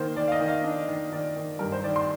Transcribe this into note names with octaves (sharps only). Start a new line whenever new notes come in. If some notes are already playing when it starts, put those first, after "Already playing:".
Already playing: D#3 A#3 A#4 C5
D#3 D5
F5
D#5
D#3
F5
D4 D#5
D#3
D#3 D5
D#3
G2 A#4
C5
D#3 D5
C6